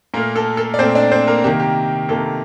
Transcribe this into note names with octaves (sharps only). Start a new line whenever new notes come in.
A#2 A3 A#3 A#4
A4
A4
D5
A#2 A3 C4 C5
D4 D5
C4 C5
A#3 A#4
C3 D#3 A#3 G4
G4
C3 D#3 A#3 A4